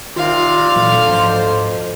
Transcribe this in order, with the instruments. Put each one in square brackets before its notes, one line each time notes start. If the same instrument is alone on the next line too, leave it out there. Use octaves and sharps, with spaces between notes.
[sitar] C3 [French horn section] D#3 [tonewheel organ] F4 C6 [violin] D5 F5
[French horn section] D2 A4 [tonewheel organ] A#2 E3 F#3
[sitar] F2 C5 [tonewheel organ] G#2